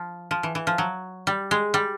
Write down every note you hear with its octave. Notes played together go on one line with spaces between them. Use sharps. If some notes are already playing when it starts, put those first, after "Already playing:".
Already playing: F3
F3
E3
E3
F3
F#3
G3
G#3
G3